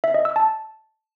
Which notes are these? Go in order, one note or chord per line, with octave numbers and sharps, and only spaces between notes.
E5
D#5
E6
A5